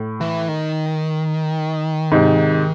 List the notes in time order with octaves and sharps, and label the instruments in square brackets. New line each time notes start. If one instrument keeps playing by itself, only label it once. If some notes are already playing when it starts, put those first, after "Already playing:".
Already playing: [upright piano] A2
[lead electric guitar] E3
D#3
[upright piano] G#2 C3